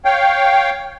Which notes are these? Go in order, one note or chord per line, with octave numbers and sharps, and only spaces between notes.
C#5 F5 G5